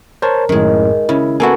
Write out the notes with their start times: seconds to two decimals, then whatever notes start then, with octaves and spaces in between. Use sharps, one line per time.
0.22 A#4 C5 C#5 A5
0.49 F#2 A2 D#3 G#3
1.09 C#3 E4
1.40 A#3 B3 E4 F#4 A4 G#5